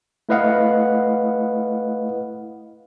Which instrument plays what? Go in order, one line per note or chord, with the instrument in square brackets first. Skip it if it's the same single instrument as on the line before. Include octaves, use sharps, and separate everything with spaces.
[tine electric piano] A3 E4 B4 D#5 F5 F#5